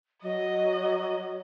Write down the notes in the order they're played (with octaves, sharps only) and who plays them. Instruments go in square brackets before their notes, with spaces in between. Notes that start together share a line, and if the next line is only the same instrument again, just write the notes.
[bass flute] F#3 [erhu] D#5